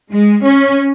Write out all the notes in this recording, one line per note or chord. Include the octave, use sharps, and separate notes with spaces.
G#3
C#4